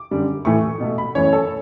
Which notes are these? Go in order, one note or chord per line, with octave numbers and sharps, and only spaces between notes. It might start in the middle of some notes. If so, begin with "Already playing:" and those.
Already playing: D6
F#2 D3 G3
A2 E3 A3 C#6
B2 A3
B5
F#2 E3 A3 C#5
A4